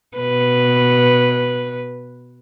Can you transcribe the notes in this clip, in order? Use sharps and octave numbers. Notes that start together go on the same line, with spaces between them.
B2 B4